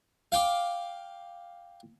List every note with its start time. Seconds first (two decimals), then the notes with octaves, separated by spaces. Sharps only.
0.32 F5 G5 D6